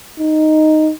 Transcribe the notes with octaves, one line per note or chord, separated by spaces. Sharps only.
D#4